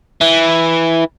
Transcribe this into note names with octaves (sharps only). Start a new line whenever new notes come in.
E3